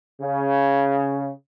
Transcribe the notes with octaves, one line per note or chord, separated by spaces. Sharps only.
C#3